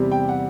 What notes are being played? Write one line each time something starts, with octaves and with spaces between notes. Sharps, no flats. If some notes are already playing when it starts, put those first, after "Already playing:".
Already playing: E2 C3 G3
G5
F#5